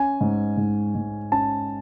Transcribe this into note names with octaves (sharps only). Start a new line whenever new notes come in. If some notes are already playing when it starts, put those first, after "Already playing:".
Already playing: C#4 G#5
G#2
G#2
G#2
C#4 A5